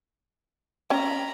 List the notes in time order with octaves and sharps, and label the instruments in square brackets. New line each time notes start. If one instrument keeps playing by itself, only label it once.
[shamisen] C#4 G5 [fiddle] A#5 B5